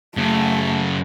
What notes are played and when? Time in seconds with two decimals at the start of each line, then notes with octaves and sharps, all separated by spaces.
0.17 F#2 C#3 A3